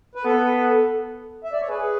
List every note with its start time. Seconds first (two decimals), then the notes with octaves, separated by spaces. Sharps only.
0.15 B4
0.25 B3 A4
1.44 E5
1.52 D5
1.60 C#5
1.69 G#4 B4